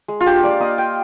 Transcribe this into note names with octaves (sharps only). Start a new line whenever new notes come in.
G#3
F4
D4 G4
A#3 D5
A#3 D#5
F4 G5